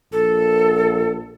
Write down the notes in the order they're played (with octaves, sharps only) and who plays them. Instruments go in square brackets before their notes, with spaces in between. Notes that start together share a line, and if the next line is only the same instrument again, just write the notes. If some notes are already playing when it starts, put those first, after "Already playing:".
[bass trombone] A#1 [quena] A4